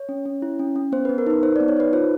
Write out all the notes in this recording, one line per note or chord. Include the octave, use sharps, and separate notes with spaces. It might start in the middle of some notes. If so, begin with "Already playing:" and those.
Already playing: C#5
C#4
C#4
E4
C#4
C#4
B3 C5
B3 B4
A#4
D#4 B4
D#4 C5
B3 D5
C#5
D#4 B4
F4 C5